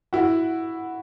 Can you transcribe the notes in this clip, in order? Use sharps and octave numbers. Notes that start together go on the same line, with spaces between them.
E4 F#4